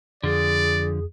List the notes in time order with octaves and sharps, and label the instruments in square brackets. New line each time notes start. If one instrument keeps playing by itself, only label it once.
[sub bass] F2 [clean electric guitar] D3 F3 [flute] G#4 [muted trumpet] D5